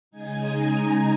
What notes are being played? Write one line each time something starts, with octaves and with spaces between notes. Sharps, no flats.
C#3 G#3 D#4 G#5
A#5